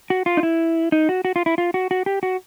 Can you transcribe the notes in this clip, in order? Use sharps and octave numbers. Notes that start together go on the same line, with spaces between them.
F#4
F4
D#4
E4
D#4
F#4
F#4
F4
E4
F4
F#4
F#4
G4
F#4